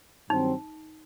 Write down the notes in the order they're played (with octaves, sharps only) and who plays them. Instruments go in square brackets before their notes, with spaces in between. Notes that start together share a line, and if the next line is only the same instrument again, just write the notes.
[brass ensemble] G2 D#3 F#3 C4 [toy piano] D#4